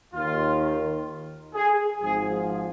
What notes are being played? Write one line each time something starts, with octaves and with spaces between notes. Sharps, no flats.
D#2 D#3 F4
G#4
G#1 G#2 F3 G#4